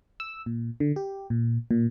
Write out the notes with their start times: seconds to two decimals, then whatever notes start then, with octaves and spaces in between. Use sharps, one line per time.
0.20 E6
0.46 A#2
0.80 D3
0.96 G4
1.30 A#2
1.71 A#2